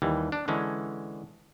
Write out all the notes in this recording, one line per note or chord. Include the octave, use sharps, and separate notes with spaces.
D#2 E3 G3
D4
D3 E3 G#3 C#4